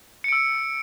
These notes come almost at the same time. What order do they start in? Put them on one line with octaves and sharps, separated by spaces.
C#7 D7 E6